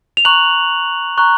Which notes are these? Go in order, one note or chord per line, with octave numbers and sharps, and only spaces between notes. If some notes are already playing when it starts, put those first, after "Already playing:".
F7
A#5 C#6 F#6 F#7
A#5 C#6 F#6